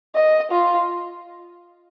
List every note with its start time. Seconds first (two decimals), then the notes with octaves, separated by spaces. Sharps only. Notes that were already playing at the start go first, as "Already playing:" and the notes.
0.15 D#5
0.51 F4